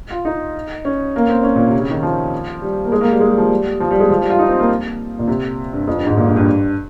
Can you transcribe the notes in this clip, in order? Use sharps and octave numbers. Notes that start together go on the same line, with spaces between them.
F4
D#4
C#4
A#3
C4
C#4
A#2
C3
C#3
D#3
F3
G3
A#3
G#3
A#3
G3
G#3
G3
F3
G3
F3
G3
G#3
F3
G3
F4
D#4
C4
A#3
A#2
C3
G2
F2
G2
G#2
A#2
G2
G2